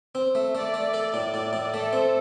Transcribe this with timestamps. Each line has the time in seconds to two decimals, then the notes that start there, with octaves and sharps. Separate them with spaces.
0.15 C4
0.35 A3
0.55 A3 D5
0.74 A3
0.93 A4 D5
1.14 A2
1.34 A2 D5
1.53 A2
1.74 A3 A4
1.93 C4